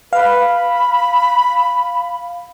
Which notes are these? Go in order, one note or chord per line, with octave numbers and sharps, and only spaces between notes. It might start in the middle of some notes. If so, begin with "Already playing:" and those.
B4 F5
B5